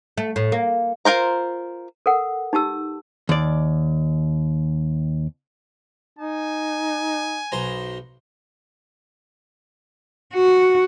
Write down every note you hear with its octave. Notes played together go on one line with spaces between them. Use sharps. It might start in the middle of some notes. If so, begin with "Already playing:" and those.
A3
A2
A#3
F4 A#4 C5 A#5
A4 A#4 F#5
D#4 G4 A5 E6
D#2 D5
D#4 G#5
B1 C5 A#5
F#4